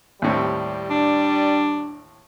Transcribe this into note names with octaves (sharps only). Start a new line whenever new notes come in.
D#2 A2 G3 C4
D4